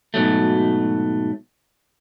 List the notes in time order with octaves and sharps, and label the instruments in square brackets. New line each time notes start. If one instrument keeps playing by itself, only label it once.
[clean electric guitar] G#2 B2 F#3 A3